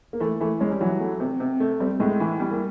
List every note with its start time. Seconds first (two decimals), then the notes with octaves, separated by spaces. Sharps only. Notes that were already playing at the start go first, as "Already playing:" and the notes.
0.13 A#3
0.20 E3 A3
0.40 E3 A3
0.60 G#3 C#4
0.71 G3
0.81 E3 F#3
1.00 A3
1.20 C3
1.40 C3
1.60 A3
1.80 G3 C4
2.00 A2 G#3
2.20 E3
2.40 G3
2.51 A#3